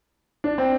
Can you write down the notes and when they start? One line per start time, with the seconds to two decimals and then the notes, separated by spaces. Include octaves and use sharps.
0.44 D4
0.58 C4